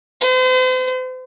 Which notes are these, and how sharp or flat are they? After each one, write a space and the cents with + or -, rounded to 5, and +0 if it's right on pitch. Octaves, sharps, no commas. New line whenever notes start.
C5 -40